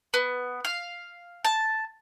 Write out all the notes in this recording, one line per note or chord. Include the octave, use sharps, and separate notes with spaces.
B3
F5
A5